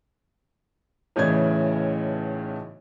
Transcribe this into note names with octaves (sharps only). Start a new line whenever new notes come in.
B1 A2 C#3 E3 D5 G#6